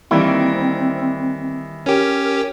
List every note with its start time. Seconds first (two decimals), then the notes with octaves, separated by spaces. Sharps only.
0.11 D#3 E3 G3 A#3 C4 E4
1.86 C#4 G4 A#4